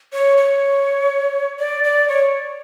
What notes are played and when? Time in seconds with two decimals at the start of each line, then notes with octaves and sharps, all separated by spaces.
0.13 C#5
0.37 C#5
1.59 D5
1.84 D5
2.08 C#5